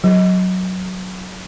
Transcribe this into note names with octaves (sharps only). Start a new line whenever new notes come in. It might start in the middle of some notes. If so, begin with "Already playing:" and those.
F#3